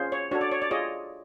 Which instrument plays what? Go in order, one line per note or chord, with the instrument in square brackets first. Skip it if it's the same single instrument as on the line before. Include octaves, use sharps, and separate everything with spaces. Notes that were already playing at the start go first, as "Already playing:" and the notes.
Already playing: [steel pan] C#4 F4 G#4 C5
C#5
D4 F#4 A4 C#5
D5
C#5
D5
F4 G#4 C#5 D#5